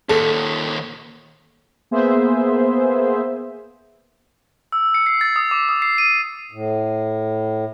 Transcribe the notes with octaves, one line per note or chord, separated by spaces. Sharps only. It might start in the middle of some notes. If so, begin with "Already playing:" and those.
D#2 A#2 A4
A#3 B3 G#4 C5 E5
E6
C#7
C7
A6
D#6
D6
D#6
C7
D#7
A2